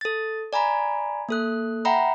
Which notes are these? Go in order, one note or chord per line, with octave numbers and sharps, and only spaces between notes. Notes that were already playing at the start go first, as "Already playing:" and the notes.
A4 A6
D5 G#5 A#5 B5
A#3 A4 F#6
E5 F#5 G5 A#5 B5